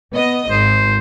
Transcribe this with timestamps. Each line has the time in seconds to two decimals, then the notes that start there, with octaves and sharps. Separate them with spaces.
0.14 B3 D#5
0.50 G#1 C5